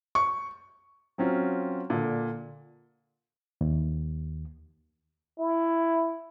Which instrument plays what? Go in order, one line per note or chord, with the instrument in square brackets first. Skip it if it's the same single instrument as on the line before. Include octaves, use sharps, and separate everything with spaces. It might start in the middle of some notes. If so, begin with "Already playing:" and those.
[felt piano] C#6
[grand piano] F#3 C4 C#4 F4
A#2 D3
[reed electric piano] D#2
[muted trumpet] E4